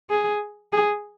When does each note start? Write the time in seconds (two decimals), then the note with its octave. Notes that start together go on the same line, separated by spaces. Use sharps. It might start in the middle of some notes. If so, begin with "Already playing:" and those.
0.10 G#4
0.73 G#4